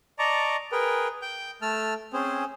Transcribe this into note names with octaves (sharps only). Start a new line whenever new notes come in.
D5 D#5 A5 A#5 C#6 D6
G#4 A#4 B4 G5
G5 G6
A3 A5 E6 F6
C4 C#4 G#4 C5